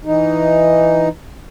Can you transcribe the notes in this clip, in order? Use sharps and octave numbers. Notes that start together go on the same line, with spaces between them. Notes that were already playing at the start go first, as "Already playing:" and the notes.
E3 D#4